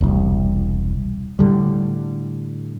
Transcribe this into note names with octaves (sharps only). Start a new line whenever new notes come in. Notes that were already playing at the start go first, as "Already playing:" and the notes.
E1 C2
A2 D3 G3